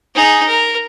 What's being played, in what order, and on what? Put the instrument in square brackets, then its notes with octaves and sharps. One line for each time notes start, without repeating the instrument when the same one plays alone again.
[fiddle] D#4 G#4
A#4